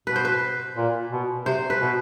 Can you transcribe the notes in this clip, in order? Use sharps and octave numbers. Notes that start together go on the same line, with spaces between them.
B2 B4
C5
B4
A#2
B2
C3 C5
B4
B2